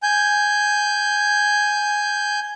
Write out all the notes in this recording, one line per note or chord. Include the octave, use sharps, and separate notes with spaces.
G#5 G6